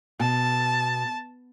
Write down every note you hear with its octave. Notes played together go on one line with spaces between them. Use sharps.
B2 A5